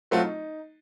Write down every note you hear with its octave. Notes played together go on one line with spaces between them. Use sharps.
F#3 A3 C4 F4 F#4
D#4